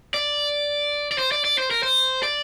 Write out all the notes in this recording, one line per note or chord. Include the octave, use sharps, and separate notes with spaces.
D5
D5
C5
D5
D5
C5
A#4
C5
D5